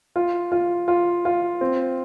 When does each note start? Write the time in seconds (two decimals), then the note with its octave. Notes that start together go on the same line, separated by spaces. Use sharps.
0.16 F4
0.52 F4
0.88 F4
1.25 F4
1.61 C4